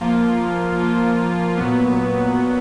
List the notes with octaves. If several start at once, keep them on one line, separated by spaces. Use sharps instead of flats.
F3 A#3 F4
F3 A#3 F4
A#2 F#3 B3
A#2 F#3 B3